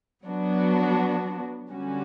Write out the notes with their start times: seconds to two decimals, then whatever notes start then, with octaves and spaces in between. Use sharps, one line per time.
0.24 F#3 B3 D4 F#4
1.70 D3 G3 C#4 F#4